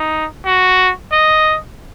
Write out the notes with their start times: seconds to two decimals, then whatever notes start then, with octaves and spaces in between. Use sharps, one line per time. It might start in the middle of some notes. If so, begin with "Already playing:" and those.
Already playing: D#4
0.45 F#4
1.12 D#5